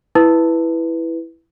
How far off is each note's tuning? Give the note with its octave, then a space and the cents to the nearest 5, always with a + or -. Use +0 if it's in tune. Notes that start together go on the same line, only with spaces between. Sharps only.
E4 +0 B4 +0